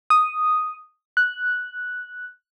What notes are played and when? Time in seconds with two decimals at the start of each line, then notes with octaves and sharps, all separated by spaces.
0.10 D#6
1.17 F#6